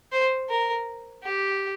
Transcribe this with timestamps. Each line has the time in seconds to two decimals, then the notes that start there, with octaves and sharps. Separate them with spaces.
0.12 C5
0.49 A#4
1.24 G4